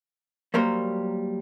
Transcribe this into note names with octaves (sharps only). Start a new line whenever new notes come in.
F#3 G3 A#3 A#4 C5